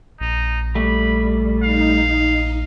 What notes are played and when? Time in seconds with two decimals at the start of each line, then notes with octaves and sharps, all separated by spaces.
0.21 A#1 D#4
0.75 G3 A3 B5
1.63 D#4 F5